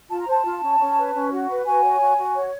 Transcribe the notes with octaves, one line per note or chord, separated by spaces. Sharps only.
F4 A5
A#5
C5 A5
F4
C#4
C#4
B4
C#4
F#4
B4
F#4 G#5
C#5
F#4
F#4
C#5